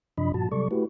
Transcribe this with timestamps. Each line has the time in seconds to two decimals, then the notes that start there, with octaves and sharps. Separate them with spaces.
0.18 F#2 C3 F3 D4 D#5 B5
0.34 G2 A#2 F3 F#4 A5
0.52 C3 F#3 G3 A4 D5 C#6
0.71 A3 E4 F#4 G4 B4